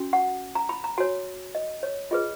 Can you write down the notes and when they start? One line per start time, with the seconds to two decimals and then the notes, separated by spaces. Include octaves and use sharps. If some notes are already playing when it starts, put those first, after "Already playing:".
Already playing: C#4 F#4
0.13 F#5
0.55 A#5
0.69 B5
0.84 A#5
0.98 F#4 C#5 G#5
1.55 D#5
1.83 C#5
2.11 F4 G#4 B4 D#5